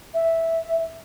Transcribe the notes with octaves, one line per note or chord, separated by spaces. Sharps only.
E5